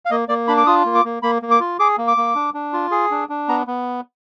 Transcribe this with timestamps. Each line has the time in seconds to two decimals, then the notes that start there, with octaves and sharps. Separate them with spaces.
0.05 F5
0.10 A#3 D#5
0.29 A#3 D5
0.48 D4 B5
0.57 D6
0.66 F4 D#6
0.86 A#3
0.95 D6
1.04 A#3
1.23 A#3 B5
1.42 A#3
1.51 D6
1.60 F4
1.79 G#4 D6
1.98 A#3
2.08 D6
2.17 A#3
2.35 D4
2.54 D4
2.73 F4
2.91 G#4
3.11 D4
3.29 D4
3.48 B3 A#5
3.67 B3